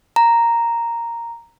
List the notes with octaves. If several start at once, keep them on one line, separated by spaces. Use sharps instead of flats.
A#5